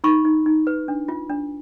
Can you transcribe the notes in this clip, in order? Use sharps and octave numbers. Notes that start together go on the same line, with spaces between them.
D#4 B5 C#6
D#4
D#4
B4
D4
F4
D4